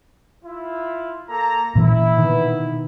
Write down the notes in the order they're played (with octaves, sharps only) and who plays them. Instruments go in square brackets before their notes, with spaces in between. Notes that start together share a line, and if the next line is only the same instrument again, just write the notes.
[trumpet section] E4 F4
A#3 A4 A#5
[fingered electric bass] A#2 E3 A#3 [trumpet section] E4
[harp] B2 D#3